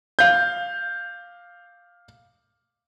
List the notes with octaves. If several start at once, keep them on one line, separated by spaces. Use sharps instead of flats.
F5 G6